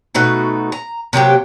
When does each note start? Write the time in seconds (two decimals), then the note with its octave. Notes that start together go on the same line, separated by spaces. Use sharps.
0.15 B2 A3 D#4 F#4
0.72 A#5
1.13 C3 F#3 A#3 G4